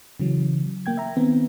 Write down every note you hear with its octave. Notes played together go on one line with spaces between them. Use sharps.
C#3 E3 F#3
A#3 G5 G#6
E5 A#5
D#3 B3 C4